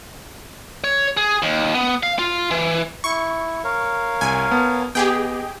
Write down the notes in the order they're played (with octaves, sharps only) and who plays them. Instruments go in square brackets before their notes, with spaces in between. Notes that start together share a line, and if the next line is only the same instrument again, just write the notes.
[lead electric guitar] C#5
G#4
D#2
B3
F5
F4
E3
[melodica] E4 [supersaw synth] C#6
[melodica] A#4 C#5 F5
[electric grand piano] C2 [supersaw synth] G#5
[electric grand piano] B3 A5
[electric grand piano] B3 [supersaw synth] G4 G#4 G5 [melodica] D#5